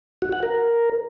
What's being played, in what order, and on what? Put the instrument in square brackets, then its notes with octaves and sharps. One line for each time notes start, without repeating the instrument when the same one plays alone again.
[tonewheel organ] F#4
F#5
A#4